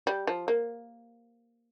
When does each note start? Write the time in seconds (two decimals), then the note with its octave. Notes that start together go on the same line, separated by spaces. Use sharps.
0.07 G3
0.27 F3
0.48 A#3